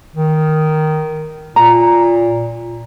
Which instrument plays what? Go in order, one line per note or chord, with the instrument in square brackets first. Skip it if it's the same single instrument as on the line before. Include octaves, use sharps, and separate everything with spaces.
[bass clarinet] D#3
[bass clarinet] A#2 [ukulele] A#5